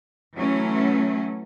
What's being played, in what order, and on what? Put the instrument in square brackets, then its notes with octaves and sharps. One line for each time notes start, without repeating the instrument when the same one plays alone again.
[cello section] E3 F#3 A3 C#4